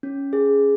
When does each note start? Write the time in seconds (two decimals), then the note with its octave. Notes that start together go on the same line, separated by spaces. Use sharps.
0.03 C#4
0.33 G#4